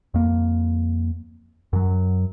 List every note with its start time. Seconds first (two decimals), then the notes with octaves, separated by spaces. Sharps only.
0.14 F2 A#3
1.73 F#2 F#3